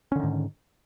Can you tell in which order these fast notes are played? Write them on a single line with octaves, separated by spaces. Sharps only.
C#4 D3 D#3 G#2